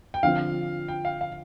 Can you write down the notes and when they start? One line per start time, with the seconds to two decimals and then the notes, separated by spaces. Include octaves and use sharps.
0.14 G5
0.23 D3 F3 C4 F4 F5
0.88 G5
1.05 F5
1.21 F5